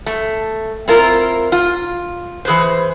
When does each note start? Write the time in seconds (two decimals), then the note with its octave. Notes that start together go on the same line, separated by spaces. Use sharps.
0.06 A3
0.88 C4 E4 F4 A#4
1.52 F4
2.45 E3 G#4 B4 C5